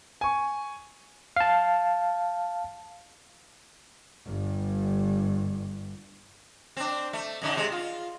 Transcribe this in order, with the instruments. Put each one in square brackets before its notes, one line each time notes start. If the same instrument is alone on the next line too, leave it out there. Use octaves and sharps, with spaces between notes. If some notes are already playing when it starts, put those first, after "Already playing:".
[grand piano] G#5 C#6
[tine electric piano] F5 A5
[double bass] G1 G2
[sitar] C4 D4
A3
F#2 D3 D#4
C3 G#3
F4